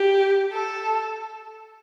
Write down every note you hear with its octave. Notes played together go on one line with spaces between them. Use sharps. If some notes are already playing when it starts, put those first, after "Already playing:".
Already playing: G4
A4